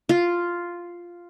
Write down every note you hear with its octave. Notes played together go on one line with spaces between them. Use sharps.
F4